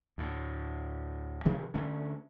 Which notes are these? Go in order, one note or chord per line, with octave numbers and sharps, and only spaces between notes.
D2 A2
G2 C3 D#3 F3
D3 A3 C#4